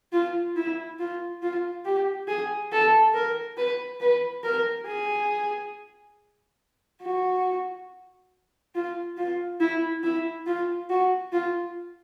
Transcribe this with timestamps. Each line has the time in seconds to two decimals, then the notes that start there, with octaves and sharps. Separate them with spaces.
0.12 F4
0.56 E4
0.99 F4
1.42 F4
1.85 G4
2.28 G#4
2.72 A4
3.14 A#4
3.57 B4
4.00 B4
4.43 A#4
4.87 G#4
7.02 F#4
8.75 F4
9.17 F4
9.60 E4
10.03 E4
10.46 F4
10.90 F#4
11.32 F4